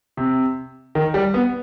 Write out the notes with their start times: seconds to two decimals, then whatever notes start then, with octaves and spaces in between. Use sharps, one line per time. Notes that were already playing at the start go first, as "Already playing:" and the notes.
0.17 C3
0.95 D#3
1.14 G3
1.34 B3